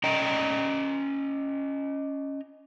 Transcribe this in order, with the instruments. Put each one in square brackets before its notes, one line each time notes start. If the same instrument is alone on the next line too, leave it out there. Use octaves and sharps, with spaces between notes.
[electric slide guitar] C#4 D#5 G5 A#5